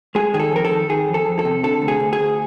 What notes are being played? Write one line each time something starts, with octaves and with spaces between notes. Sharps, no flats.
G#3 G#4
D#3 G#4
A4
F2 A#4
A4
D#3
D#3 G#4
F2
A4
F2
A4
C3
D3 A4
D2
G#4
D2
G#4
D2